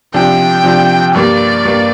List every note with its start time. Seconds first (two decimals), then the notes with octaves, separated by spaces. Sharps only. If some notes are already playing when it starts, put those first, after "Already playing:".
0.14 C3 F3 D4 G5
0.64 C3 F3 D4
1.14 G2 G3 A#3 D5
1.65 G2 G3 A#3